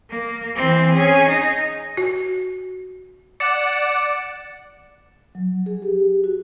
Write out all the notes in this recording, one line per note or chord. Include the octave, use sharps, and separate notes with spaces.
A#3
E3 C4
C#4 G#4
D#4
F#4
D5 F#5 D6 A6 C#7
F#3
G#4
G4
F#4